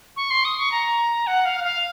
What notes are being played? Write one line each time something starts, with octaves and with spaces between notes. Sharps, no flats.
C#6
C6
D#6
C#6
A#5
F#5
F5
F5